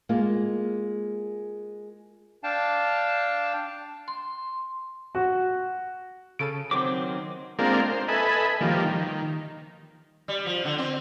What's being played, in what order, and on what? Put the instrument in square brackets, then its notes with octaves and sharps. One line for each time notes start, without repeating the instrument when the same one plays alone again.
[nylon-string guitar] G#3 A#3 F4
[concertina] D4 F5 G5 A5
[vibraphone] C6
[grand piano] F#4
[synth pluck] C#3 A4 D#7 [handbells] D7
[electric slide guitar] D#3 F#3 [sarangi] C4 [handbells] D6
[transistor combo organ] G#3 A#3 C4 D4 F4 A#4
C5
A4 B4 D#5 E5 G#5 B5
D#3 F3 G3 A#3
D#3
[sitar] G3
F3
D3
C4